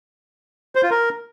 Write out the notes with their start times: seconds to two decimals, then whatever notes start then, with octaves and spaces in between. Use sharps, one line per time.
0.75 C5
0.83 F4
0.91 A#4